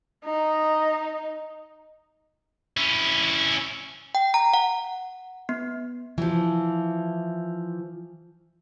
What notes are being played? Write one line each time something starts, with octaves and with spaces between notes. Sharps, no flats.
D#4
C#4 E4
G5
A#5
F#5
B3
E3 F3